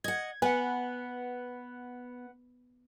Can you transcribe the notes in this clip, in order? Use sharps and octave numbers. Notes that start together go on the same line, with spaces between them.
D#5 F#5 G#6
B3 B4 F#5 G#5